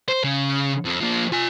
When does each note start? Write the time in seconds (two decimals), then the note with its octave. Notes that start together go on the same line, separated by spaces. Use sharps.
0.09 C5
0.24 C#3
0.85 F2
1.01 F3 A#3
1.32 F4 G#5